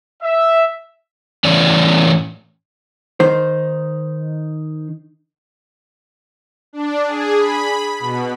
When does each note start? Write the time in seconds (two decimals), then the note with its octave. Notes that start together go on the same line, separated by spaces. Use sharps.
0.22 E5
1.45 A2 E3 C#4 D5
3.20 D#3 D#4 C5
6.73 D4
7.07 G#4
7.38 B5
8.00 B2